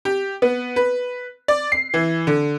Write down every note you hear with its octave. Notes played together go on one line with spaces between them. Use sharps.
G4
B3
B4
D5
C7
E3
D3